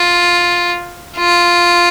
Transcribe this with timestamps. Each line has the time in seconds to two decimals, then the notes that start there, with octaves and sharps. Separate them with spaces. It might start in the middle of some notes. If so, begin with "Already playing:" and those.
Already playing: F4
1.18 F4